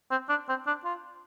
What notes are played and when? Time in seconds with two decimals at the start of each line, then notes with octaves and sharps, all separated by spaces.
0.11 C4
0.29 D4
0.49 C4
0.67 D4
0.85 F4